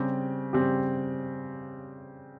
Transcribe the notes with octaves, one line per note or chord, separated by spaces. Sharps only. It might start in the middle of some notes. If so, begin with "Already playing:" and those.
Already playing: C#3 G3 C4 G4
C#3 G3 C4 G4